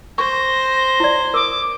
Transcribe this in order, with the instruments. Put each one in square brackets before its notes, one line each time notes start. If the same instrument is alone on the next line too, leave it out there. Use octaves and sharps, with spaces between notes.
[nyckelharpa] C5 [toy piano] C#6 [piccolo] A#6
[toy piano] E4 D5
[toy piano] A#4 D#6 [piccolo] D6